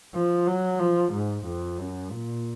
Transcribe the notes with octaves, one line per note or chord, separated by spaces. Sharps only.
F3
F#3
F3
G#2
F2
F#2
A#2